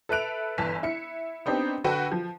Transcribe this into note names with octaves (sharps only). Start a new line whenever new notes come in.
A4 B4 E5 F#6 D7 F7
G1 E3 G#5 A5 B6 F7
E4 C#7
B3 C4 D4 D#4 G4
D3 F#4 A4 B4 G5
F3